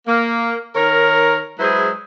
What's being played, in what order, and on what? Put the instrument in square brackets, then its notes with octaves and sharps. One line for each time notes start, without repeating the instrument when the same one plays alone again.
[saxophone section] A#3
D#3 A#4 C#5
F#3 G#3 E4 G#4 B4 C5